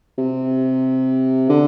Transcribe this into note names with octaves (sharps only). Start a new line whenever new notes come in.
C3
D3